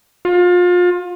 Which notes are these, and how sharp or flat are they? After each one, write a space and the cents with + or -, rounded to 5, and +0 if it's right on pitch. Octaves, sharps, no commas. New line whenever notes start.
F4 +30